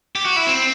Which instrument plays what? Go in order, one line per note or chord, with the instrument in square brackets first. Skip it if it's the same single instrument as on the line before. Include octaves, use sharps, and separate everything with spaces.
[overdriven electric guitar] G4
F#4
E4
C4